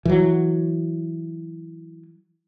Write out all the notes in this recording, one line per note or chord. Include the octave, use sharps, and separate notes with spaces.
E3 F#3